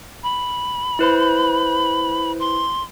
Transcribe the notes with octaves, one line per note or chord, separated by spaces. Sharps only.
B5
E4 B4 C5
C6